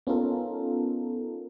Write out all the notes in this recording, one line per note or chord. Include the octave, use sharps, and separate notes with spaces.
B3 C#4 D#4 F4 A4 A#4